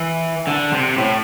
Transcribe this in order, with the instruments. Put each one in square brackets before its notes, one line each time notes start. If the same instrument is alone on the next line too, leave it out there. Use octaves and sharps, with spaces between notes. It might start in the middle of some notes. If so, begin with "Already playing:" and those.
Already playing: [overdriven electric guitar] E3
D3
C3
A2